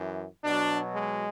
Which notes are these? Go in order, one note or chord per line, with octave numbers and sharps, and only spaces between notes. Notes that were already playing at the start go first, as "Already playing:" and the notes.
Already playing: F#2 E3
B2 F#3 D4
G#3